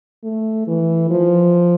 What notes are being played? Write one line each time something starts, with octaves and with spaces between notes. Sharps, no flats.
A3
E3
F3